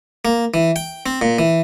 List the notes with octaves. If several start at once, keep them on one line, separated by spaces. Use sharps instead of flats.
A#3
E3
G5
C4
A#2
E3